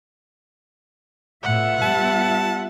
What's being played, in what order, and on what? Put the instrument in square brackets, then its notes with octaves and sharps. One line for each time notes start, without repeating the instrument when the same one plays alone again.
[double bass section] A2 [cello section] B3 F4 E5 [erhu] F#5
[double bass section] G3 [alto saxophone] A5